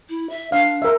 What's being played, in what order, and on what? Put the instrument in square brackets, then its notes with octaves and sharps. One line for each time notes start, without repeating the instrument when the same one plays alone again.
[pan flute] E4
E5
[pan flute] D4 [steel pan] F5
[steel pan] A#4 E5